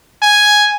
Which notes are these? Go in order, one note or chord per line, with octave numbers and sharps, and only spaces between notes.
G#5